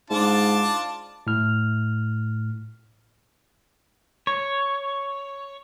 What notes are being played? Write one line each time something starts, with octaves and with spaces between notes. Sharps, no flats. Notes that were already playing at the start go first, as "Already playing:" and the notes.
G#2 D4 F4 A5
A2 F6
C#5